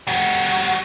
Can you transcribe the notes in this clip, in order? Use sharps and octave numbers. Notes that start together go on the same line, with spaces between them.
G3 F#4